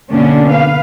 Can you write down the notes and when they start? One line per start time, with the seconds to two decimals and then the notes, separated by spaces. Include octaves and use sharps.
0.10 B2 D3 A#3 C#4 D4
0.51 B4 F5